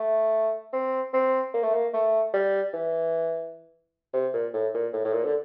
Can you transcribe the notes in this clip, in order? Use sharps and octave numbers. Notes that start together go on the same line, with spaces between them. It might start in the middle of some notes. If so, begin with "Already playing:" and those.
Already playing: A3
C4
C4
A#3
A3
A#3
A3
G3
E3
C3
A#2
A2
A#2
A2
A2
A#2
D3